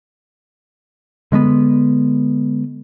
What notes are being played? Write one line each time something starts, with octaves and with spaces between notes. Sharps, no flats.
D3 G#3 A#3 B3